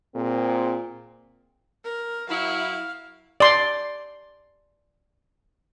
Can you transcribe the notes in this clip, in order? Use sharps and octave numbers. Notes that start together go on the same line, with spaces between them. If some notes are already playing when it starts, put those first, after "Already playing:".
A#2 C4 G#4
A#4
F#3 E4 F5
D5 C6